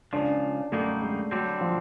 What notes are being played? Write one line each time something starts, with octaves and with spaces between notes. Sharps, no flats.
C#2 C#3 F3 D4
F#2 D3 G3 A3 A#3 D#4
G#3
D3 F#3 G3 C4
F3